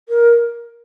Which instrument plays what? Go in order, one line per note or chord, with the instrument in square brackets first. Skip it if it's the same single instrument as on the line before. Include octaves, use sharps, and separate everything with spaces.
[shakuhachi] A#4